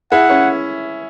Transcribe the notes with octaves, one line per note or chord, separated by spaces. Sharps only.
E4 G#4 F#5
C#4 E4